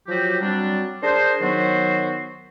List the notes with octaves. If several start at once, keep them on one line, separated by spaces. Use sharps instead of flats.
F3 F#3 F#4 G4
F#3 G3 C4 D4
D4 G#4 A#4 C5
D#3 F#3 B3 F#4 C5